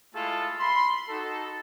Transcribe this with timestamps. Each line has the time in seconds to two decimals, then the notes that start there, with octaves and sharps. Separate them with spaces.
0.15 G#3 A3 E4 F4 G#4 A4
0.59 B5 C6
1.09 D#4 F#4 A4